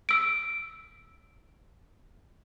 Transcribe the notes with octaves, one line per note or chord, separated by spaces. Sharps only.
E6 D7